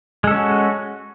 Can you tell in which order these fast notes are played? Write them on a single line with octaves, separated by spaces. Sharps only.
G#3 A4 C#4 F#4